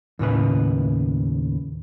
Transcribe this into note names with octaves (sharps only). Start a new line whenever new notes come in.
D#2 A2 C#3 B4